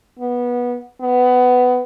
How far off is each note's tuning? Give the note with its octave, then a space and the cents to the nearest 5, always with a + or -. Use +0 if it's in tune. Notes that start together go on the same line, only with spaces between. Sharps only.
B3 -15
B3 +15